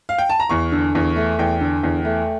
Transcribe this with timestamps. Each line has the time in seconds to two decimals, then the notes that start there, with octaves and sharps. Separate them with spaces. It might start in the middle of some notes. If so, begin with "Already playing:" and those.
0.09 F5
0.18 G5
0.30 A5
0.40 A#5
0.49 E2 C#6
0.72 D3
0.95 E2
1.16 A3
1.39 E2 G5
1.61 D3
1.83 E2
2.05 A3